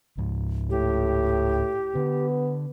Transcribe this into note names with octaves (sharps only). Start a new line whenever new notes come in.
C#2 G#2
A2 G4
D3 B3